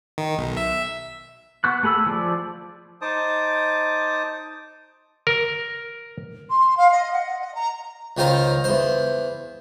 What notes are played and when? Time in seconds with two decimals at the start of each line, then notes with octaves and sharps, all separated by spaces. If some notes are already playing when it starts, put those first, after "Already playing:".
0.18 D#3
0.38 B1
0.57 E5
1.64 B3 C#6 F#6
1.83 A3 G#4 B5 E6
2.06 F3 D5
3.01 D#4 C5 A5 D6 D#6
5.27 A#4
6.50 C6
6.77 F5
6.92 D#5
7.13 F#5
7.40 D#5
7.55 A#5
8.17 C#2 D#3 F4 C5 A#5
8.64 E2 C5